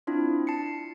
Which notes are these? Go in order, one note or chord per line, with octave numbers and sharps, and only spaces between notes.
C4 D4 E4 F4
A5 C7 C#7